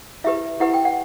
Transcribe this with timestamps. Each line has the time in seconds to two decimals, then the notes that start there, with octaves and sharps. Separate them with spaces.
0.24 E4 G4 B4 E5
0.60 E4 G4 B4 F#5
0.74 G5
0.85 F#5